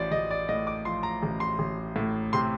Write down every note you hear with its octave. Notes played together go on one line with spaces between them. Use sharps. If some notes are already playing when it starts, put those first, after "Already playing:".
Already playing: A1 F3 D5
A1 D#5
D5
A2 D#5
D6
F3 C6
A#5
A1
C6
A1
A2
C3 C6